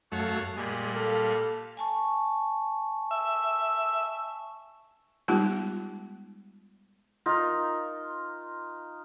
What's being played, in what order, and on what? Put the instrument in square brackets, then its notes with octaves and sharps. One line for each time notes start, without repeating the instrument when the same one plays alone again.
[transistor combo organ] F#2 A3 [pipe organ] C#5 F5 F#5
[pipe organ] A#2 G3 [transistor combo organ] G#3
[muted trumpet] A4 [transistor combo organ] F5
[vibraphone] G#5 A5 C#6
[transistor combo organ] E5
[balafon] G3 G#3 B3 D#4 F4 G4
[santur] D#4 F4 A#4